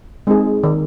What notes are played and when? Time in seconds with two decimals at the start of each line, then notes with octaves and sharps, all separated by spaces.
0.27 G#3 C4 D#4 G#4
0.63 D#3